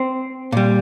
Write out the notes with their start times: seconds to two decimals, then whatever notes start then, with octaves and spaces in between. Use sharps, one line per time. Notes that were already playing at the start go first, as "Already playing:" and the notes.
Already playing: C4
0.52 A#2 G3